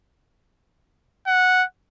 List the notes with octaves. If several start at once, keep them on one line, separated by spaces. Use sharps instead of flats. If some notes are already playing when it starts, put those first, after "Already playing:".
F#5